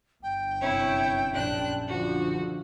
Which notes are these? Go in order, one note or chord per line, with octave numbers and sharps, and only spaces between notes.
G1 G5
F#2 C3 E4 C#5
A#1 F#2 D4 F#6
D3 F3 F#4